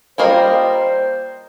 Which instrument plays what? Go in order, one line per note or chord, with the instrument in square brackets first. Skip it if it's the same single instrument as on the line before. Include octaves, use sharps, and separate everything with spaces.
[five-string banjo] G3 A#3 F4 A#4 D#5 [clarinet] C5